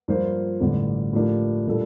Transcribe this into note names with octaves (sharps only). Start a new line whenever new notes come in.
G2 F3 A#3 F4 C5
A1 G2 D3
A2 F3 A#3 D4 G4
A#2 G3 D4 A4